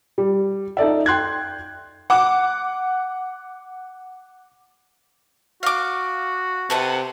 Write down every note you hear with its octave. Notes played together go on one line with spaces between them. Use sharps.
G3
D#4 A4 D5 E5
G5 C6 F#6 G#6
F#5 D6
F#4 F5 D6
C3 A4 B4 F#5